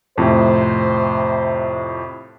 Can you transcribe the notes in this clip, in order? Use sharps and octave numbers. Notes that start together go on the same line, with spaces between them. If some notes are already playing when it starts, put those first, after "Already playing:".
F2 A2 C3 C5